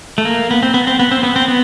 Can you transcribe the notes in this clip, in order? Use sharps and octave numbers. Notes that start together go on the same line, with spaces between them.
A3
A#3
B3
C4
B3
C4
B3
C4
B3
C4
B3